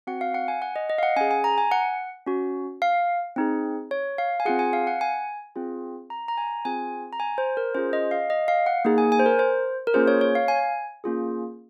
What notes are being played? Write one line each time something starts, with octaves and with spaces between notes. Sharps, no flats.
C4 F#4 F#5
F5
F#5
G#5
F#5
D#5
D#5
F5
F#5
C#4 G#4 G#5
G#5
A#5
G#5
F#5
C#4 F#4
F5
C4 D#4 G#4
C#5
F5
G#5
C4 F4 G#4 F#5
G#5
F5
F#5
G#5
C4 F4 G#4
A#5
A#5
G#5
C4 F4 G#4 G#5
A#5
G#5
C5
A#4
C#4 F4 G#4 C5
D#5
F5
D#5
F5
F#5
A#3 D#4 G#4
G#5
G#5
C5
A#4
C5
A#4
A#3 C#4 F4 G#4 C5
C#5
C#5
F5
G#5
A#3 C#4 F4 G#4